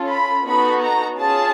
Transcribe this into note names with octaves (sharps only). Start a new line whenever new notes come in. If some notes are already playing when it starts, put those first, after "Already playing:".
Already playing: C#4 F4 A4
B5
B3 D#4 F#4 A4 B5
A#5
C#4 F4 G#4 A5